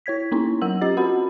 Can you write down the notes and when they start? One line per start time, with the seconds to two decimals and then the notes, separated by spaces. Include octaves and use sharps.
0.06 E4 C#5 G#6 B6
0.32 A#3 B3 C#4 D#4 E4
0.61 F#3 A#4 F#5 E6 F#7
0.81 C#4 F4 G4 D#5 A6
0.97 C4 F#4 A#4 F#5 B5